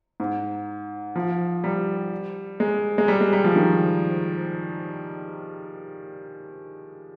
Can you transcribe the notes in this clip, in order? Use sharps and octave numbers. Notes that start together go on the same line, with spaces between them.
G#2
F3
G3
G#3
G#3
G3
G#3
G3
F3
D#3